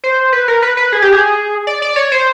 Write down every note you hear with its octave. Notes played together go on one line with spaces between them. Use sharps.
C5
B4
A#4
B4
B4
G#4
G4
G#4
D5
D5
C#5
C5